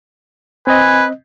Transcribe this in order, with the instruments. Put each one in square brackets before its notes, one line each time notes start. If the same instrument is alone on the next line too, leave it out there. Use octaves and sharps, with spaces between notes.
[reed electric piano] C4 D#5 [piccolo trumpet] B4 [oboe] G#5